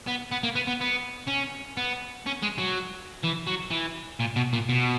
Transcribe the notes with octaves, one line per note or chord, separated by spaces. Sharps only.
B3
B3
A#3
B3
B3
B3
C#4
B3
C#4
G#3
F#3
E3
F#3
E3
A#2
B2
A#2
B2